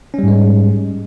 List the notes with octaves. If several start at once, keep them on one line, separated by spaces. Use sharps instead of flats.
G#2 G3 G#3 C#4